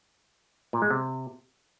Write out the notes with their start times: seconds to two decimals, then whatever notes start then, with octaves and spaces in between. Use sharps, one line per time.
0.73 A#2
0.82 G#3
0.90 C3